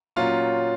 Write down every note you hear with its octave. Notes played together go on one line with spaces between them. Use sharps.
A#2 F#3 C#4 F4